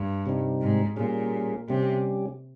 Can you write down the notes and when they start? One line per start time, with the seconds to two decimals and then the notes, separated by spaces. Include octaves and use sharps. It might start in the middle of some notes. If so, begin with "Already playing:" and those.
Already playing: G2
0.26 C3 G3 C4 D#4
0.61 G#2
0.96 A#2 G3 C#4 G#4
1.68 C3 G3 C#4 G4